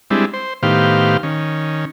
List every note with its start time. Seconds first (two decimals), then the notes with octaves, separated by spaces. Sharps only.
0.10 G3 G#3 C4 D4 E4
0.34 C5
0.63 A2 D#3 B3 G4 C5 F5
1.23 D#3 C#4